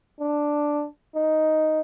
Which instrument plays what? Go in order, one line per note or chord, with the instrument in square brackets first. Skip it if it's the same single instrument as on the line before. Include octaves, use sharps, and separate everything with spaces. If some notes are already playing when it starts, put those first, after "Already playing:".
[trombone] D4
D#4